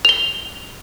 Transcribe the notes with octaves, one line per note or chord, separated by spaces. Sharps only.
F7 G7